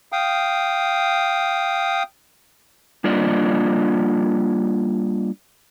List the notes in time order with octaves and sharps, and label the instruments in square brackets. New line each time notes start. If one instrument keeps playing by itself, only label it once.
[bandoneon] F5 G5 D#6
[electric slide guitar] G3 A#3 D4 F4 D5 D#5